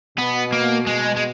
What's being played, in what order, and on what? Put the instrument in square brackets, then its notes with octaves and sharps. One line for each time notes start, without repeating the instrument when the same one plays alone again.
[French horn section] B2 [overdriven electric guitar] B3
[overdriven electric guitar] A#3
G#3
G#3